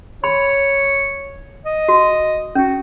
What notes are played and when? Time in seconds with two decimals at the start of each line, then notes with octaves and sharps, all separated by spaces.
0.24 C#5 B5
1.65 D#5
1.88 F#4
2.55 C#4 F#4